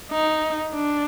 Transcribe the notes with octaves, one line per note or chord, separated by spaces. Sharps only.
D#4
D4